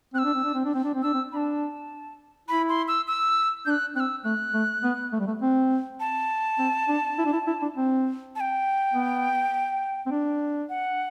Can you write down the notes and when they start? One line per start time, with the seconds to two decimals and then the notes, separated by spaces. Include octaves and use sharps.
0.14 C4 F#6
0.19 E6
0.25 D4
0.34 C4
0.44 D4
0.54 C4
0.65 D4
0.74 C4
0.84 D4
0.94 C4
1.02 D4 E6
1.14 C4
1.31 D4 B5
1.37 A5
2.48 E4 B5
2.69 C6
2.88 E6
3.07 E6
3.66 D4 F#6 G6
3.96 C4 F#6
4.00 E6
4.24 A3 F#6
4.54 A3
4.83 B3
5.13 A3
5.20 G3
5.27 A3
5.42 C4
6.00 A5
6.59 C4
6.88 D4
7.18 E4
7.25 D4
7.33 E4
7.47 E4
7.62 D4
7.76 C4
8.36 A5
8.40 G5
8.93 B3
10.06 C4
10.11 D4
10.69 F#5